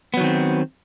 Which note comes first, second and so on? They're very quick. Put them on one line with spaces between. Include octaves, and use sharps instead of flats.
B3 F#3 D#3 C4